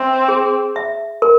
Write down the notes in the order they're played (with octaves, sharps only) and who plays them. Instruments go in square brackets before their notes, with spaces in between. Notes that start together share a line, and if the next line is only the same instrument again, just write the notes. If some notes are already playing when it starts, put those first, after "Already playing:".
Already playing: [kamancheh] C4 [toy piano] E5
[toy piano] G#4
E5
A#4